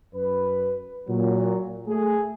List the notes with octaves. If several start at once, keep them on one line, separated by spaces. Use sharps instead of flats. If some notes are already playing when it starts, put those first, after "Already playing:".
F#2 B4
A#2 F#3
A3 G#4